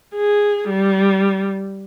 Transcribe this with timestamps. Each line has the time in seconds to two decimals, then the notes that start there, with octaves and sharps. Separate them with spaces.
0.16 G#4
0.70 G3